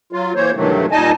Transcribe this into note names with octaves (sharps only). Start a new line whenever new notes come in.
F#3 F4
E3 A#3 C5 C#5
G2 C3 D#3 E3 F#3 A3
A#2 G3 D#4 D#5 G#5 A5